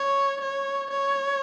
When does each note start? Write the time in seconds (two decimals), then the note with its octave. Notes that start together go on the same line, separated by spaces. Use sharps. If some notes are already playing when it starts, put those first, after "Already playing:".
Already playing: C#5
0.42 C#5
0.91 C#5